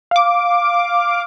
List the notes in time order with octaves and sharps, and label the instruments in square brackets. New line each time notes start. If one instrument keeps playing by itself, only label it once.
[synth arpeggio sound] F5 D6